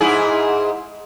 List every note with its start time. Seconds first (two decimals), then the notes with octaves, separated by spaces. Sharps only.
0.01 G#2 E4 G#4